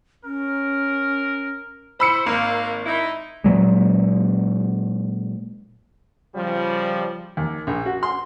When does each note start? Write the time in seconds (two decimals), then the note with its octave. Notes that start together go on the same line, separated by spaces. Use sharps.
0.24 C#4 A#4
2.00 E4 C5 B5 E6 C#7
2.26 G#1 A#3
2.86 D#4 E4
3.44 A#2 F#3 G#3
6.34 C#3 F3 G3
7.37 D#2
7.67 A#1
7.86 F#4
8.03 C6